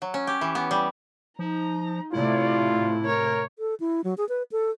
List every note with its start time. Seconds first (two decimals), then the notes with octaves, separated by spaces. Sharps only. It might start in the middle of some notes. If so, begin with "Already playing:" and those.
0.02 F#3
0.14 C#4
0.27 G4
0.41 E3
0.55 B3
0.71 G3
1.39 F3 D#4 A#5
2.13 A2 C3 A3 E4 F4 D5
3.06 A#4 C#5
3.59 A4
3.80 E4
4.04 F#3
4.18 G#4
4.29 B4
4.52 A4